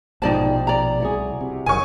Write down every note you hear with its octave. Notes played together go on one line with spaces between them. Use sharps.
A#1 G#2 B2 F3 D#4 G4 D5 A5
D5 A#5
C2 E4 F#4 G#4
C3
F#1 D#3 F#3 G#5 C#6